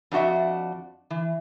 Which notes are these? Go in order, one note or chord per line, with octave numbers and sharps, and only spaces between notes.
F2 D4 F#4 D#5 E5
E3